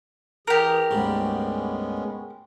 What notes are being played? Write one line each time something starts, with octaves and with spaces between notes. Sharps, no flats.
E3 G4 G#4 A#4
D2 G#2 G3 G#3 B3 C#4